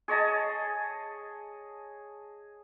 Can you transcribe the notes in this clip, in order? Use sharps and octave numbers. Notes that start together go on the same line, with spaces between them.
G#4 C#5 D#5 A5